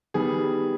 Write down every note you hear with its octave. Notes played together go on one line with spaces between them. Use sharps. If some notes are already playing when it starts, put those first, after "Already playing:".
D#3 G3 B3 G#4